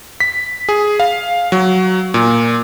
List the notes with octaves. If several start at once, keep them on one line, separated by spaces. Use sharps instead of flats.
B6
G#4
F5
F#3
A#2